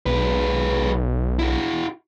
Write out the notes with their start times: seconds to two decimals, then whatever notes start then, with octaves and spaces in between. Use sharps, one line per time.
0.06 B1 G#3 B4
1.39 E4 F#4